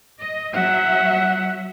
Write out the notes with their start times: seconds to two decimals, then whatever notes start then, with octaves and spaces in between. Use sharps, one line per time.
0.20 D#5
0.53 F#3 E5 F#5